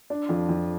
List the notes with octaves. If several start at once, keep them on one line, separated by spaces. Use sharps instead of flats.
D4
F2
F2